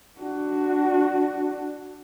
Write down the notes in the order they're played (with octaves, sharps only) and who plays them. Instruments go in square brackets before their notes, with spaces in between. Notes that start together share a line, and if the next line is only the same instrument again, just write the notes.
[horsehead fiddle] D4 F#4